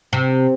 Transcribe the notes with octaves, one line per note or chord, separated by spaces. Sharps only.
C3